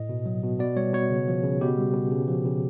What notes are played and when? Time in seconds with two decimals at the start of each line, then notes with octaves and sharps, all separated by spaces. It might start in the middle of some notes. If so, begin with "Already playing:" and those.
Already playing: A2 D#5
0.09 B2
0.26 F#3
0.44 B2
0.59 B2 D5
0.77 G3 C#5
0.94 B2 C#5
1.10 C#3
1.28 F3
1.44 C#3
1.61 B2 G4
1.77 G3
1.94 B2
2.11 C#3
2.28 F3
2.45 C#3